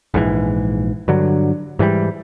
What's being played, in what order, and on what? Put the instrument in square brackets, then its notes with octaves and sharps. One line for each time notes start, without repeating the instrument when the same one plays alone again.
[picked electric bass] A#1 G#2 C3 E3
G2 D3 F#3
G#2 E3 F3 G3